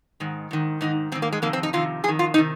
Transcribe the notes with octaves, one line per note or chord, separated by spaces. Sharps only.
G#2 D#3
G#2 D#3
G#2 D#3 D#4
G#2 D#3 C4
A#3
G#3
F2 C3 D#3 A#3
C4
D#4
F2 C3 D#3 F4
F2 D#3 G#4
F4
C3 D#3 D#4